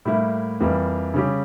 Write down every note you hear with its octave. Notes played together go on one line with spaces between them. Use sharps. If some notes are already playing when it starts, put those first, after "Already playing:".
A2 G3 A#3 E4
F2 E3 G3 A#3
C#3 G3 C#4 G4